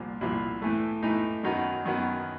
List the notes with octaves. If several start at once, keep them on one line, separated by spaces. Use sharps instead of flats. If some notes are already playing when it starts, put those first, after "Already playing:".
Already playing: C2 A#2 F3
C2 A#2 F3 E4
A2 E3 A3
A2 E3 A3 D#4
F#2 D#3 F#3 B3 D#4
F#2 D#3 F#3 B3